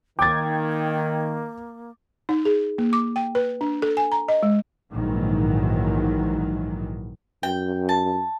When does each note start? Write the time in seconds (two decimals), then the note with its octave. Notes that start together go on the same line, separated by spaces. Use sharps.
0.19 D#3 A#3 G5 D6 G#6 A6
2.29 D#4
2.45 G#4
2.78 A#3
2.93 D6
3.16 G5
3.35 B4
3.61 D4
3.82 A4
3.97 G#5
4.12 A#5
4.28 D#5
4.43 G#3
4.91 A#1 G#2 D#3 E3 F#3
7.43 F#2 G5
7.89 A5